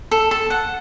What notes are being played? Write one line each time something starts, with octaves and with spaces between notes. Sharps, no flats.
A4
A4
F#5